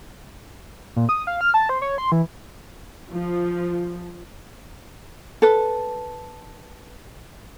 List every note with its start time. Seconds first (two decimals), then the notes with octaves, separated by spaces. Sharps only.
0.96 A#2
1.09 D#6
1.27 F5
1.41 F6
1.54 A5
1.69 C5
1.82 C#5
1.98 C6
2.12 E3
3.11 F3
5.42 A4 B4